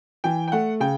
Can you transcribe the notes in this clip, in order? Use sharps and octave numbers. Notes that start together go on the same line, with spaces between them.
E3 G5
G5
A3 F#5
C#3 G5